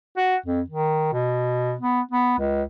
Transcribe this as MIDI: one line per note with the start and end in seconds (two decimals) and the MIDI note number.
0.17 0.36 66
0.47 0.61 41
0.70 1.10 51
1.13 1.75 47
1.81 2.01 59
2.11 2.36 59
2.39 2.63 37